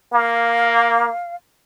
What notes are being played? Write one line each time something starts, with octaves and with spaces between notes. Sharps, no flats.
A#3 F5